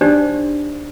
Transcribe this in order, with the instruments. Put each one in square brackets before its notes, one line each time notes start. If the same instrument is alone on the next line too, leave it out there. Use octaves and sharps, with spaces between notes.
[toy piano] D4 D#4 G4 C5 D5